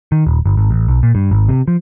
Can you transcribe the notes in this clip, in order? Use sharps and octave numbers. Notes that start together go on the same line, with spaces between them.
D#3
D#1
G1
G#1
A1
B1
A#2
G2
G#1
C3
F3